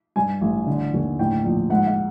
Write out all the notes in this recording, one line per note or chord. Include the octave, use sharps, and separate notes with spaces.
G2 G#5
A1
D3
D#2
A2 G5
A#1
G#2 F#5
F5